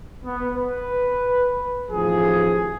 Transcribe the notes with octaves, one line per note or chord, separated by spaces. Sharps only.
B3
B4
A1 D#2 F3 G#4